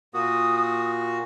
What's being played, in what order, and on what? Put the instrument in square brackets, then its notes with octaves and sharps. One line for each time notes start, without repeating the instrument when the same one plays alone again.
[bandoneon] A#2 A#3 F#4 [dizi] D#6